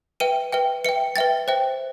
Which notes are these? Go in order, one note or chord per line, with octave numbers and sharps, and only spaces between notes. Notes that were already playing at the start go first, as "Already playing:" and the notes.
B4 E5 G5 D#7
B4 E5 G5
B4 E5 G5 C#7
B4 E5 G5 A6
C5 E5 G5